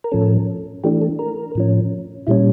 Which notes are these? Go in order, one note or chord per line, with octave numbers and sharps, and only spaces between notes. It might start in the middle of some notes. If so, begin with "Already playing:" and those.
A#4
A2 F3 C#4 A4
E3 A3 D4 G4
A4
A#4
A2 F3 C#4
A#2 G3 C#4 E4